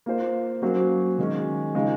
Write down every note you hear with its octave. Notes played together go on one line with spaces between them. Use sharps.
A#3 F4 C5
F#3 A#3 C#4 F#4 C5
D#3 G#3 C#4
C#3 F3 G#3 D#4